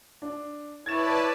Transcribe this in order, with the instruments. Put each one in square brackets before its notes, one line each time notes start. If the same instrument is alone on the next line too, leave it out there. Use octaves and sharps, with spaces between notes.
[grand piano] D4
[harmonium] E4 C#5 [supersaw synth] B4 D5 A5 [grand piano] G#6 A6 E7